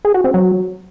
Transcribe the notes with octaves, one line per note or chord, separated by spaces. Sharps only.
G#4
F#4
C4
F#3